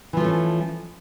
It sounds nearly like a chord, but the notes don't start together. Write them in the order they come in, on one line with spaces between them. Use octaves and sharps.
E3 F3 A3 C#4